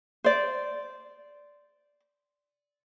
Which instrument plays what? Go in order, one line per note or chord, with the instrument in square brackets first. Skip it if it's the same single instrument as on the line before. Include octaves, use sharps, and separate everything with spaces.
[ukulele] C5 D5